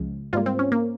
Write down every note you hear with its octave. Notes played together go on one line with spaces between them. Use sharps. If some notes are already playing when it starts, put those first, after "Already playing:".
Already playing: C#2 C#3 F3 G#3
G#2 G3 A#3 F4
C4
C#4
A#3